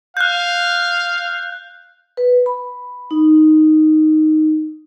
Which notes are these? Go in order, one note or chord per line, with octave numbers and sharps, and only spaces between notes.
F5 F#6 G6
B4
B5
D#4